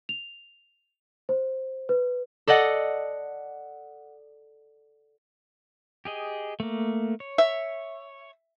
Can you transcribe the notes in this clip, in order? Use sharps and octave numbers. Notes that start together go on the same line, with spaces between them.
F7
C5
B4
A4 D5 D#5 F#5
G4 G#4 D#5
A3 A#3
C#5
E5